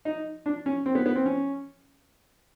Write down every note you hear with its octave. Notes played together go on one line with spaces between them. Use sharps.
D#4
D4
C#4
C4
B3
B3
C4
C#4